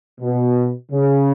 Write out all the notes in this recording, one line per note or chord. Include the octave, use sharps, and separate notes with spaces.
B2
C#3